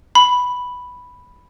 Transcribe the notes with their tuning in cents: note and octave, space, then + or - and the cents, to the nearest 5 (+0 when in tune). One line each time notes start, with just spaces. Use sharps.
B5 +0